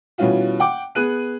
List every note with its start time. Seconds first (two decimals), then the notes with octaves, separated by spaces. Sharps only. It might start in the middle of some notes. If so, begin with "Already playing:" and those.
0.18 B2 E3 G3 C#4 F4 F#4
0.60 F#5 G5 D6
0.95 B3 G#4 F#6 D#7